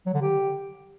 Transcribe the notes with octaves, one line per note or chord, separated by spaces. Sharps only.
F#3
D3
G4